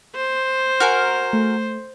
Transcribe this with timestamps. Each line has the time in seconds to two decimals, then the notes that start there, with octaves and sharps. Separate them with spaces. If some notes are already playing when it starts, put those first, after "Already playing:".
0.15 C5
0.80 F#4 A#4 G#5 F6
1.33 A3